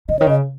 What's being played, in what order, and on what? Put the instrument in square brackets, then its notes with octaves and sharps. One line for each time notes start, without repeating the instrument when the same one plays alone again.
[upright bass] C#3 [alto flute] D#5
[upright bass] D#3 [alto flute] C#5
[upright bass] C#3 [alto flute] D#5